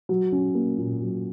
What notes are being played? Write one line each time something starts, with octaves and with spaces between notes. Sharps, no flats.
F#3
C#4
A#3
A#2
F#3